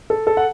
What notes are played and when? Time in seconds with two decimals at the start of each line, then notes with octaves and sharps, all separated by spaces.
0.10 A4
0.27 A4
0.37 F#5